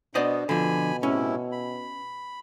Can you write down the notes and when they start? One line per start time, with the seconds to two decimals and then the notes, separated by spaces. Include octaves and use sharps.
0.15 B2 B3 D4 C5 D5 D#5
0.49 B2 D3 F3 G#5 B5
1.03 A2 C3 C#4 E4
1.52 B5